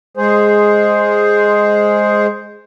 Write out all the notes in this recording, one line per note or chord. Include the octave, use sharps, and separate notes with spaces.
G#3 G#4 C5